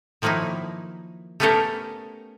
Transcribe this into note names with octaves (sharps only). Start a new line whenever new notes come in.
D#3 F3 F#3 A#3 D#4 E4
A3 B3 C#4 G4 A4 A#4